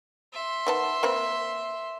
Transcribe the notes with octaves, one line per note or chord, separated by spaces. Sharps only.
E5 C6
D#3 B3 A5
A#3 C4 B4